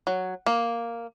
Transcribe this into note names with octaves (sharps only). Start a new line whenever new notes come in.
F#3
A#3